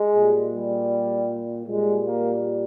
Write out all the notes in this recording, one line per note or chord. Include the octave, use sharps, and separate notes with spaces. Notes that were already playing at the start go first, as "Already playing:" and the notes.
Already playing: G#3
A#2 G3
G3
A#2 G3 G#3
A#3